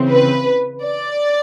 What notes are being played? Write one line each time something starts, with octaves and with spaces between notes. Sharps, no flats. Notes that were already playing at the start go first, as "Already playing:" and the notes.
Already playing: C#3 E3 C4
B4
D5